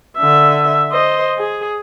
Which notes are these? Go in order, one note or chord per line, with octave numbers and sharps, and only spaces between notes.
D3 E5
C5 D#5
G#4